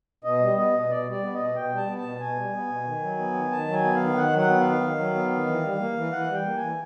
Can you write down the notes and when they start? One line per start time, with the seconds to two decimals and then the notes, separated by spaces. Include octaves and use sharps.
0.24 B2 D#5
0.41 G3
0.57 B3 D#5
0.73 B2
0.89 B2 D5
1.06 G3 D5
1.23 B3
1.34 D#5
1.39 B2
1.55 B2 G5
1.72 G3
1.77 A5
1.87 B3
1.98 A5
2.04 B2
2.20 B2 G#5
2.37 G3
2.53 B3
2.69 B2
2.86 D#3
3.02 F#3
3.19 B3
3.34 D#3
3.51 D#3 A5
3.68 F#3
3.73 G#5
3.84 B3
3.95 D#3 F5
4.16 D#3 F#5
4.33 F#3 F#5
4.49 B3
4.61 D#3 F5
4.82 D#3
4.98 F#3
5.15 B3
5.31 D#3
5.47 E3
5.63 G3
5.80 A#3
5.97 E3
6.12 E3 F#5
6.28 G3
6.34 G5
6.46 A#3
6.57 G#5
6.62 E3